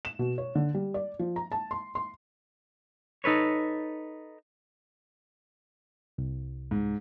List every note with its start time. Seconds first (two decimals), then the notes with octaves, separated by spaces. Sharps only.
0.05 E7
0.19 B2
0.38 C#5
0.55 D3
0.74 G3
0.94 D5
1.19 F3
1.36 A#5
1.52 A5
1.71 C6
1.95 C6
3.24 D#4 A4 B4 C#5
6.18 C2
6.71 G#2